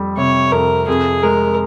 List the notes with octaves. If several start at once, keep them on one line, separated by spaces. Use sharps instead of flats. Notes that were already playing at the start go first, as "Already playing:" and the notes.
Already playing: F2 G3
C3 C#5
F2 A#4
F2 G#4
G#3 A#4